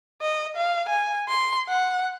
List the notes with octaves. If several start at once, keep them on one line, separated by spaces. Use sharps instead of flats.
D#5
F5
G#5
C6
F#5